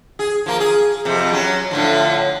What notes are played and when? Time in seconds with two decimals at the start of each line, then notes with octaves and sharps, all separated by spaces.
0.19 G#4
0.46 F3 A#3
0.60 G#4
1.05 F2 C3
1.32 F#3 C#4
1.71 A2 D3 F3